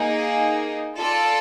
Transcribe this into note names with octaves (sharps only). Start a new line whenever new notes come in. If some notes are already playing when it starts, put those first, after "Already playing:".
Already playing: A#3 D#4 G#4
F4 A4 D5